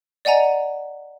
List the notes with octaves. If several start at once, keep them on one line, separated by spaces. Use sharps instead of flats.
D5 D#5 F#5 G#5 A#5